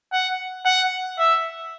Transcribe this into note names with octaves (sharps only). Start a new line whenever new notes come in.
F#5
F#5
E5